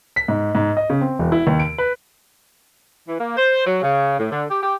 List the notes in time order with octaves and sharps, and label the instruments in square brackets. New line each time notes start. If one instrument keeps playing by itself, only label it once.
[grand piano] B6
G#2
G#2
D#5
C#3
C4
E1
E4
D#2
D7
B4
[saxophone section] E3
A#3
C5
F#3
C#3
A2
D3
G4
G4